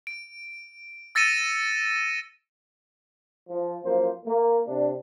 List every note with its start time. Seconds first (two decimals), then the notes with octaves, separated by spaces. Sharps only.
0.07 D7
1.15 E6 A6 A#6 C#7 D#7 E7
3.49 F3
3.83 F#2 F3 A#3 C5
4.25 A#3
4.67 C3 D4